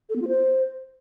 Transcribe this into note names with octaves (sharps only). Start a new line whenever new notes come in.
A4
B3
F4
C5